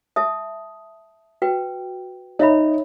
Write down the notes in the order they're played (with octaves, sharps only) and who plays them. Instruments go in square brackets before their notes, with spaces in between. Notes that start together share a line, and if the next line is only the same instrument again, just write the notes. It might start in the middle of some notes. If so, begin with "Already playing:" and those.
[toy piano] E5 A5 D#6
F#4 B4 G5
[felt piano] D#4 [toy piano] C#5 E5 B5